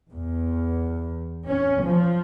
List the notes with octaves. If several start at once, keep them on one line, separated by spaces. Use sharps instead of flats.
E2
C#4
F3